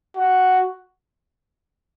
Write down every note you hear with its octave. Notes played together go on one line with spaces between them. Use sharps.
F#4